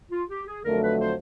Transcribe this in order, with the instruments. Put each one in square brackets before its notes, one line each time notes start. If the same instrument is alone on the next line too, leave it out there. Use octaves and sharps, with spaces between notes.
[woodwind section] F4
G4
G#4
[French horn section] F2 D3 F#3 A3 [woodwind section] A#4
[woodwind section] B4
C5